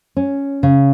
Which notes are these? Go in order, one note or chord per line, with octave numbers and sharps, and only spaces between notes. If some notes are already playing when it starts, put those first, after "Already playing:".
C#4
C#3